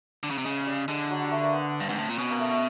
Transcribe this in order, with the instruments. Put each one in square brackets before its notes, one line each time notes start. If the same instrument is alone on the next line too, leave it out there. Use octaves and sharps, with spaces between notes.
[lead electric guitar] D3
C#3
C3
[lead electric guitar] C#3 [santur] G#3
[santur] G3
[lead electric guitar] D3 [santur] G#3
[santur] F#3
G3
A3
A#3
B3
[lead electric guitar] G2
[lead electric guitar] G#2 [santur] C4
[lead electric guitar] A2
A#2
[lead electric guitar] B2 [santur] C#4
[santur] A#3
A3